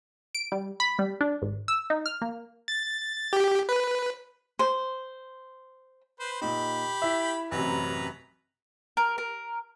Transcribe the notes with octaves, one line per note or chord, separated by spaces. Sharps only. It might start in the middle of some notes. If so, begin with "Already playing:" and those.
D7
G3
B5
G3
D4
G#1
E6
D#4
F6
A#3
A6
G4
B4
C5
B4 C5
A#2 D#4 G4 B5
E4 E5
A1 F#2 C3 B4 A#5
A#4
A#4